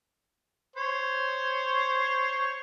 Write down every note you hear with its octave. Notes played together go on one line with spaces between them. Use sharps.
C5 C#5